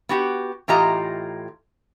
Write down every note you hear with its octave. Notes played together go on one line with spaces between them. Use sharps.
B3 F#4 G4
A2 E3 F4 G4 D#5 A#5